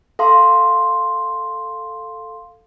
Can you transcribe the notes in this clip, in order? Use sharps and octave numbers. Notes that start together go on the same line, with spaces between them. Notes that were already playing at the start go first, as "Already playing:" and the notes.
A4 F5 C6